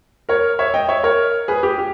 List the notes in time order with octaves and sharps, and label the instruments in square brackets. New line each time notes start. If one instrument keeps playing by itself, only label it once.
[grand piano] A#4 C#5
C#5 E5
D#5 G5
C#5 E5
A#4 C#5
G#4 B4
G4
G4